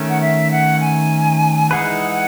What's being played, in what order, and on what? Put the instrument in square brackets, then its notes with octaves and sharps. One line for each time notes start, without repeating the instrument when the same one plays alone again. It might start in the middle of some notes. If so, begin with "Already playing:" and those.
Already playing: [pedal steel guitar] D#3 A3 C#4
[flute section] F#5
E5
F#5
G#5
[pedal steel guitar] E3 G#3 D#4 G#4 B4 [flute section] F#5